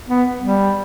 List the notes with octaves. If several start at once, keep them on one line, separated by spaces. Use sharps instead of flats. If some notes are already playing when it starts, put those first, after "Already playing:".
B3
G3